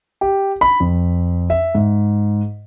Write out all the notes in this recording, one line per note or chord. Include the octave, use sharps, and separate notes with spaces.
G4
B5
F2
E5
G#2